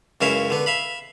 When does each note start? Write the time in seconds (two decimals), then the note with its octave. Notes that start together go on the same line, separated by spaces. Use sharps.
0.21 C#2 F#2 C#4 E4 E5 F5
0.50 D3 B3
0.66 E5 F5 B5